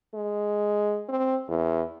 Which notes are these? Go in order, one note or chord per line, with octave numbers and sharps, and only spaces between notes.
G#3
C4
E2